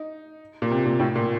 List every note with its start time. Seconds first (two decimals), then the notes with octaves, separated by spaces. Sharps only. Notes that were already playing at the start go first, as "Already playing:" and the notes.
Already playing: D#4
0.62 A#2
0.71 C3
0.86 A#2
1.00 A2
1.16 A#2